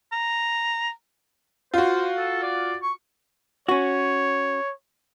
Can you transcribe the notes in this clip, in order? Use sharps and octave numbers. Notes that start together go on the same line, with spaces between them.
A#5
F4 F#4 C5
A4
D5
C#6
C#4 F#4 C#5